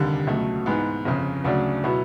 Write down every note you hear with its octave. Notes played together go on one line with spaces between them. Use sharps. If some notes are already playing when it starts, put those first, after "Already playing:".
Already playing: F1 D#2 D3 G3
C#2 B2 F#3 A3
G#2 E3 G#3 B3
G1 F2 C#3
D2 C#3 F#3 A3 D4
B2 F#3 B3 E4